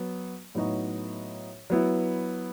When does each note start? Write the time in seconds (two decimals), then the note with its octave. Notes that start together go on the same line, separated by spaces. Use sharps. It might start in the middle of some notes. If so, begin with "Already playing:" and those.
Already playing: F#3 B3
0.55 A2 F#3 B3 D#4 F#4
1.70 F#3 B3 E4